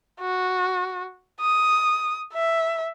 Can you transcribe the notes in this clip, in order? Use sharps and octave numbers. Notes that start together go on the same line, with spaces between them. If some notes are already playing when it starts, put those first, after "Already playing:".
F#4
D#6
E5